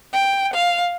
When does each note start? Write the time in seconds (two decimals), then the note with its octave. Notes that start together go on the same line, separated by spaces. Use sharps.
0.13 G5
0.54 F5